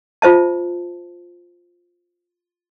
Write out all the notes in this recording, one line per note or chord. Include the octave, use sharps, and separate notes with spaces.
F4 C5 E5 A5